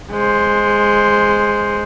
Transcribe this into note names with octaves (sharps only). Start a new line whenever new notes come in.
G#3 C5